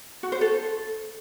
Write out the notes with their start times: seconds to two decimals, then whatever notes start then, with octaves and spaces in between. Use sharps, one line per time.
0.23 F#4
0.32 C5
0.41 A4